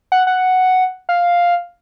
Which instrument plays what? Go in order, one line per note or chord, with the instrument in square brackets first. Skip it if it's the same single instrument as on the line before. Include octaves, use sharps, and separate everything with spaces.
[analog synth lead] F#5
F#5
F5